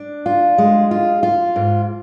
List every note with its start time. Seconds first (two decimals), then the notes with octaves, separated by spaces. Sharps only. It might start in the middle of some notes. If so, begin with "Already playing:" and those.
Already playing: D4
0.26 F4
0.58 G#3
0.91 F4
1.23 F4
1.56 G#2